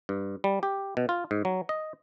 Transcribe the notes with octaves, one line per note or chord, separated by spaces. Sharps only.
G2
G3
G4
B2
F4
G#2
F#3
D#5